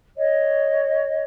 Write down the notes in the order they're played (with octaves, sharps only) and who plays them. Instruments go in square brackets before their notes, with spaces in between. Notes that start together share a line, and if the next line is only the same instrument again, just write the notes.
[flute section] C#5 D#5